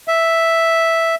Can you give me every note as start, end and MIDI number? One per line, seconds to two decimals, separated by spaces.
0.08 1.15 76